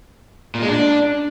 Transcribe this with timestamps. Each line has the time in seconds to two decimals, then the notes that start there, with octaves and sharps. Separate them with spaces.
0.55 A#2
0.62 G#3
0.68 D4